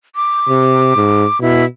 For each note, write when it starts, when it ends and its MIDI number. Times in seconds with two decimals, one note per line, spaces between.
0.16 1.41 86
0.49 0.92 48
0.96 1.25 44
1.42 1.64 47
1.42 1.65 64